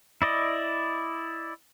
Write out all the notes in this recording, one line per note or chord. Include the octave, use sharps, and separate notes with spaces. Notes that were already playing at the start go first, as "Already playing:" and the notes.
E4 D5 D#5